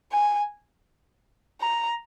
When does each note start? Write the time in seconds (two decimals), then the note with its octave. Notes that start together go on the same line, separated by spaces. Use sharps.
0.12 G#5
1.61 A#5